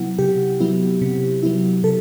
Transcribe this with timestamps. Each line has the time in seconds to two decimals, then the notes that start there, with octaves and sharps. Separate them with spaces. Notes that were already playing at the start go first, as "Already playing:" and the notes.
Already playing: C3 F#3 B3 E4 F#5
0.19 C3 G4
0.60 F#3 B3 E4
1.01 C3
1.43 F#3 B3 E4
1.83 C3 A4